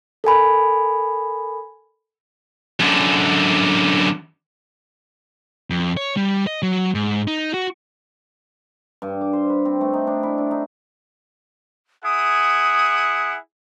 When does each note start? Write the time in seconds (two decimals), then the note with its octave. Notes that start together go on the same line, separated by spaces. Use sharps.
0.24 A4 A#4 G#5 B5
2.80 F#2 D3
5.70 F2
5.97 C#5
6.17 G3
6.47 D#5
6.62 F#3
6.94 G#2
7.28 D#4
7.54 F#4
9.02 G2
9.21 D6
9.33 C5
9.50 B4
9.65 C4
9.81 A3
9.94 D#4
10.07 D4
10.23 E4
10.38 D4
10.51 D#4
12.05 E4 G#4 F#5 D#6